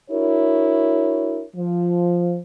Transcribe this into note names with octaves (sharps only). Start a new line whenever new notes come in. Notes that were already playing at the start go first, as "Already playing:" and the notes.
D4 E4 F#4 A#4 C#5
F3